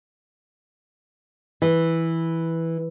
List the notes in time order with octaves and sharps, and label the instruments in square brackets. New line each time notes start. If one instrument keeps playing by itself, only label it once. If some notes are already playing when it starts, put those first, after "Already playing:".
[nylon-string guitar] E3